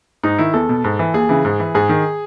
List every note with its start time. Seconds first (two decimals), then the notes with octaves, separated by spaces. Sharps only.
0.23 G#2 D#4
0.39 D#3 E4
0.54 E2 A4
0.69 B2
0.84 G#2
0.99 E3
1.14 D#2 G#4
1.29 C#3 E3
1.45 G#2
1.60 E3
1.75 G#2 G#4
1.89 D#3